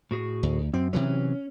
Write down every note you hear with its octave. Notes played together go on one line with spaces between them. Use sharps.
A2 F#4 G#4
D2
F#2 C4
C3 E3 F#3 C#4